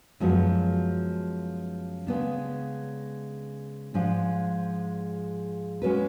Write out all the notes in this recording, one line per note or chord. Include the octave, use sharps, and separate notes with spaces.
F#2 F3 G#3 B3 F#4
C#3 G#3 B3 D4
G#2 F3 G#3 D4
G#3 C#4 F#4 B4